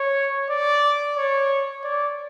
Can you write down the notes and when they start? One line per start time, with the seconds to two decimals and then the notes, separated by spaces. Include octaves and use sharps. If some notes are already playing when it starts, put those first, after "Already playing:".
Already playing: C#5
0.50 D5
1.16 C#5
1.84 D5